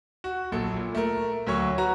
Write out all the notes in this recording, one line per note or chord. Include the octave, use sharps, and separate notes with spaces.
F#4
A#1 F#3 A4
A#2
A3 A#4
D2 F#3 C#5 C#6
F#4 B4 A#5